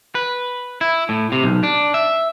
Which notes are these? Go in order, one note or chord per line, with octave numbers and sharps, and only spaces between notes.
B4
E4
A2
C3
B1
D4
E5